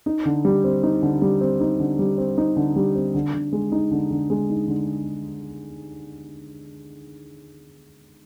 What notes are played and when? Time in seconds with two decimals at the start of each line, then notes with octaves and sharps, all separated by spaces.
0.06 D#4
0.25 D3
0.45 G3
0.64 C4
0.83 D#4
1.03 D3
1.22 G3
1.41 C4
1.61 D#4
1.80 D3
1.99 G3
2.18 C4
2.38 D#4
2.57 D3
2.76 G3
2.95 C4
3.15 D3
3.34 D3
3.53 G#3
3.72 D#4
3.91 D3
4.11 D3
4.30 G#3
4.49 D#4
4.68 D3